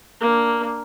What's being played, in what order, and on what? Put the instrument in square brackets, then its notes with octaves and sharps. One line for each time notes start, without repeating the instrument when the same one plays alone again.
[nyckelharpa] A#3 D4